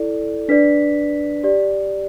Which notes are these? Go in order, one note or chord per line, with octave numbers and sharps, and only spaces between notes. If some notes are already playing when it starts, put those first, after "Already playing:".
Already playing: E4 A4 D5
D4 B4 D5 B6
G4 D5